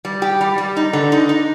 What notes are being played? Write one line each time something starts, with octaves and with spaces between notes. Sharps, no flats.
G3
G4
G3
G3
D#4
D3
D#4
D#4